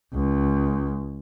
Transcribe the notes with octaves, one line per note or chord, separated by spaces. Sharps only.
C#2